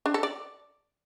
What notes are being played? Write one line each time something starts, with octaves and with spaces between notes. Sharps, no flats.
D4
A4
D5